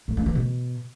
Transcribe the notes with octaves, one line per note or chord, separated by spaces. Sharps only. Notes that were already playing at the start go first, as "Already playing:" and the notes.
A2
G2
E3
B2